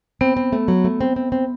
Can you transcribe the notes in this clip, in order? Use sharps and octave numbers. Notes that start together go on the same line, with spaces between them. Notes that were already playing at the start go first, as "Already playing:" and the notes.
B3 C4
C4
A3
F#3
A3
C4
C4
C4